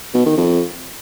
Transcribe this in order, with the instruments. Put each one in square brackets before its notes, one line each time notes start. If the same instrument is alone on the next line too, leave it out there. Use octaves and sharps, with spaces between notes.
[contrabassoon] B2
D#3
F2